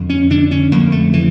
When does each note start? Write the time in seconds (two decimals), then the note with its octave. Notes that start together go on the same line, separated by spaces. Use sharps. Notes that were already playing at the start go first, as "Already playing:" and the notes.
Already playing: F2 D3
0.10 C#4
0.30 D3 D4
0.51 C#4
0.72 F2 A#3
0.92 A3
1.13 C#3 E3